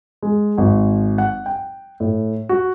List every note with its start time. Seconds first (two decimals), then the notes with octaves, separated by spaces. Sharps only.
0.23 G#3
0.58 G#1
1.18 F#5
1.46 G5
2.00 A2
2.49 F#4